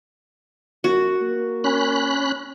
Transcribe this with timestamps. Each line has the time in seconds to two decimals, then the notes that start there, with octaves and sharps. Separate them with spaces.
0.84 F#2 F#4
1.22 A#3
1.64 C#4 B5 F#6